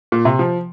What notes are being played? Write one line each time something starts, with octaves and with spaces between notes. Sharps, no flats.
A#2
C3
F3